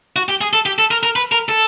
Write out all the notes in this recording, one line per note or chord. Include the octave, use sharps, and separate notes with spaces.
F#4
G4
G#4
A4
G4
A4
A#4
A#4
B4
A#4
A4